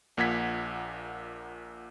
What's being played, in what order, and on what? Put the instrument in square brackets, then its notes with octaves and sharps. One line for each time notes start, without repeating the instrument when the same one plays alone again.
[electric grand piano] A#1 A#2 F#5 G#6 B6